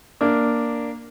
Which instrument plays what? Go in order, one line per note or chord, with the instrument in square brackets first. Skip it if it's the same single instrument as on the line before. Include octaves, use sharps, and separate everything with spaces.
[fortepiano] A#3 D4